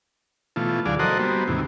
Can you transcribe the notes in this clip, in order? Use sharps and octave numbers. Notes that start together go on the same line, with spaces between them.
B2 E3 A3 F4
D2 F#3 G#4 D5 F5
F#4 A4 A#4 C5 D#5 F#5
G3 A#3 B3 F#4 C5
D#2 G#2 C3 E3